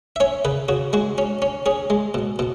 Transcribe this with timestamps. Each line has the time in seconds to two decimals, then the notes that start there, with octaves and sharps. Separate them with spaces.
0.16 E5
0.20 C#4 C#5
0.45 C#3 B4
0.69 C#3 F#4
0.93 G#3 F#4
1.18 C#4
1.42 C#4
1.66 C#4 G#4
1.90 G#3
2.14 B2
2.39 B2